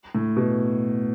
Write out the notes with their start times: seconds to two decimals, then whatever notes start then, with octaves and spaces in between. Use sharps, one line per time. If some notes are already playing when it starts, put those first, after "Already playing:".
0.15 A2
0.36 B2